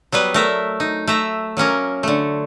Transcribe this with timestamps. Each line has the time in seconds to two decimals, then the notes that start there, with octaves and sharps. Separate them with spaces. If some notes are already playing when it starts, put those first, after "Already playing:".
0.12 F#3 G3 B3 B4
0.34 A3 A#4 E5
0.80 D#4
1.07 A3 E5 A#5
1.57 F#3 A#3 C#4 A#4
2.03 D3 A3